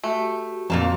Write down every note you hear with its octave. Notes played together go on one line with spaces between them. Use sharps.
A3 F#4 G4
F2 A#2 A#3 A5